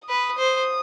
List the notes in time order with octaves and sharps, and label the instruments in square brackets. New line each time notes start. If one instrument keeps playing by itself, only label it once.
[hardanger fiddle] B4 [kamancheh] D#6
[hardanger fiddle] C5